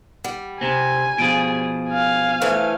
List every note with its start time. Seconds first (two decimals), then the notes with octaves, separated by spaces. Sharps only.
0.24 G3 F#5
0.61 C3 C4 G#5
1.18 B2 F3 G#4 D7
1.89 F5 G#5
2.42 E3 A3 C5 E5